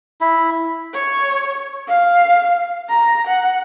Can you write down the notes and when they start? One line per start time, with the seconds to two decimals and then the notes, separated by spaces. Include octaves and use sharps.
0.21 E4
0.93 C#5
1.88 F5
2.89 A#5
3.27 F#5